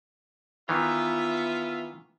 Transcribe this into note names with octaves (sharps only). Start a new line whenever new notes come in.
D#3 E3 B3 F4 E5